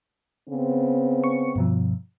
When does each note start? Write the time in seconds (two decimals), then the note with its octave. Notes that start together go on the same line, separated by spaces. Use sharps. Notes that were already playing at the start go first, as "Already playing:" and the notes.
0.48 C#3 B3 C4
1.24 C#6 C#7
1.56 G2 B2 F3